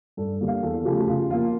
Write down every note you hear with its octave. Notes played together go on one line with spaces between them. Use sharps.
G2 A4
D3 G3 A#3
F5
E2 A4
C#3 F3 A3 G4
G4
C#3 F4
F3 A#3 F4